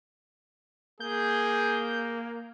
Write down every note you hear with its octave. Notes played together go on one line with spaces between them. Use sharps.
A#3 G#4 G6